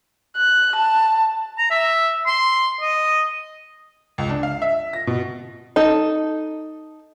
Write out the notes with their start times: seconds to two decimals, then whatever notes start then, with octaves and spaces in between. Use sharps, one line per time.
0.37 F#6
0.76 A5
1.58 A#5
1.71 E5
2.27 C6
2.81 D#5
4.18 C#2
4.29 D4
4.43 F5
4.62 E5
4.93 A#6
5.07 B2
5.76 D#4 A4